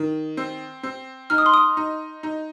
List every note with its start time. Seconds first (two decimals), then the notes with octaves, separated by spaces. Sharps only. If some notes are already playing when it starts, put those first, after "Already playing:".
Already playing: D#3
0.37 C4
0.83 C4
1.30 D#4 F6
1.38 D#6
1.46 C6
1.54 D#6
1.77 D#4
2.23 D#4